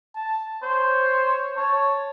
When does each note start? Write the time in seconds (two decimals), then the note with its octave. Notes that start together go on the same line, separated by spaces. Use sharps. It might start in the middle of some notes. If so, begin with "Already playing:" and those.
0.15 A5
0.62 C5 C#5
1.57 C#5 A5